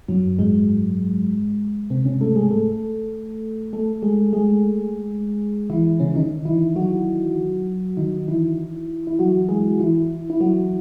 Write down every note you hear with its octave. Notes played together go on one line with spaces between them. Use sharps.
F#2 F#3
G#2 G#3
C3 C4
C#3 C#4
A3 A4
G#3 G#4
A3 A4
A3 A4
G#3 G#4
G#3 G#4
E3 E4
C#3 C#4
D#3 D#4
E3 E4
F#3 F#4
D#3 D#4
E3 E4
E4
F#3 F#4
G#3 G#4
E3 E4
E4
F#3 F#4